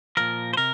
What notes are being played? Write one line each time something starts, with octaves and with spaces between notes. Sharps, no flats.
A#2 F3 A#4
C5
C3 A#4